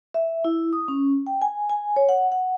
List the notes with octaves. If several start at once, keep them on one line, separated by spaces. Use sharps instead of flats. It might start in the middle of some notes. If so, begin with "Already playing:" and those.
E5
E4
D#6
C#4
G5
G#5
G#5
C#5
F#5
F#5